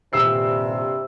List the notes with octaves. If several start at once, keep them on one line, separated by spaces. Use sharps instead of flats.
D#1 G2 C3 E6 C7